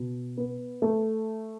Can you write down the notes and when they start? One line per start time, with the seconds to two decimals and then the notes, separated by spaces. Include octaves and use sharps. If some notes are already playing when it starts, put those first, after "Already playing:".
Already playing: B2
0.37 B3
0.82 A3